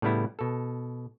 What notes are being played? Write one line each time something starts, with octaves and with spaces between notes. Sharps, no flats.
A2 C#3 G3 B3 E4
B2 A4